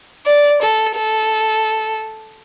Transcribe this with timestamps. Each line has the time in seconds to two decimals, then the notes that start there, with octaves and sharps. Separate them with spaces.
0.26 D5
0.62 A4
0.96 A4